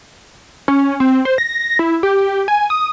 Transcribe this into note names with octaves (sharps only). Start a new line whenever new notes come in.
C#4
C4
C5
A#6
E4
G4
G#5
D#6